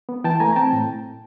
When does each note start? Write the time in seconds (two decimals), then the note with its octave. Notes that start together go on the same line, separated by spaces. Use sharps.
0.09 B3
0.24 E3 G5 A5
0.40 A3 G#5 A#5
0.53 A#5
0.56 C4 G5 A5
0.73 A2